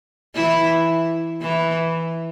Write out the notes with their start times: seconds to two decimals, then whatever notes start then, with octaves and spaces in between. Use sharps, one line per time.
0.35 E3 E4
1.42 E3 E4